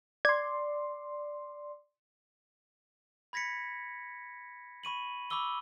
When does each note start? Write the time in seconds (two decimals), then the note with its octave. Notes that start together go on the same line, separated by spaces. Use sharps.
0.25 D5 C6 G#6
3.33 B5 G#6 A#6 B6 C#7
4.83 B5 C#6 D#7 F#7
5.30 B5 C#6 D6 E6 G7